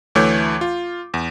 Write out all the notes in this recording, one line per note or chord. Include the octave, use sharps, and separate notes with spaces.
D2 E3 A3 C#5 D6 G6
F4
E2